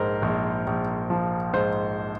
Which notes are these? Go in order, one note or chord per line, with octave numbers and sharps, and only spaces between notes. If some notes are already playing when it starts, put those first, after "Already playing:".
Already playing: A#1 G#2 A#4 C5
A#1
A#1
F3
G#2 C5